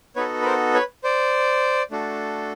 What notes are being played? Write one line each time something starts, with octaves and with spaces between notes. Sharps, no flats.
B3 D#4 F#4 A4 B4 C#5
B4
A#4 C5
B4 C#5
C5 D5
A3 D4 F#4 A4